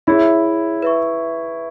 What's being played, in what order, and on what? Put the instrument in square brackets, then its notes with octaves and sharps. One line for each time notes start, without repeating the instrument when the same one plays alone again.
[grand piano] E4 [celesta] G#4 C#5 E5
[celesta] B4 E5 C#6